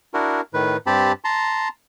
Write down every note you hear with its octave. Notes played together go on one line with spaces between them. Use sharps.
D4 E4 F#4 A#4
A2 D#3 B4
G2 C4 G4 A5 B5
A5 A#5 C6